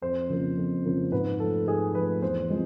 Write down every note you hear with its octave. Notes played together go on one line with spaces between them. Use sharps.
F2 C5
C#3 F3 A#3
F2
C#3 F3 A#3
G#2 B4
F3 A3 A4
G#2 G#4
F3 A3 B4
E2 C5
C3 F3 G#3